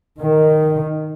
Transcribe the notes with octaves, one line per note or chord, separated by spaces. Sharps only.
D#3